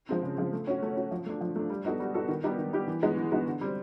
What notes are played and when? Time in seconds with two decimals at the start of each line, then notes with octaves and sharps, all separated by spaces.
0.09 F3 G#3 C4
0.23 C#3
0.38 F3 G#3 C4
0.53 A3
0.67 C#4 F#4
0.82 A3
0.97 C#4 F#4
1.11 F3
1.26 A3 D4
1.41 F3
1.56 A3 D4
1.70 G3
1.85 B3 D#4 F#4 A4
2.00 G3
2.14 B3 D#4 F#4 A4
2.28 D#3
2.44 G3 B3 D#4 G4
2.58 D#3
2.73 G3 B3 D#4 G4
2.87 E3
3.02 G#3 B3 D#4 F#4
3.17 E3
3.32 G#3 B3 D#4 F#4
3.46 D3
3.61 G3 C4